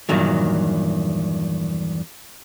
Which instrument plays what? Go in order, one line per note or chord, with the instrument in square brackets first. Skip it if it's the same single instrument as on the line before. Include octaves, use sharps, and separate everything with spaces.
[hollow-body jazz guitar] E2 G2 A#2 D#3 F#3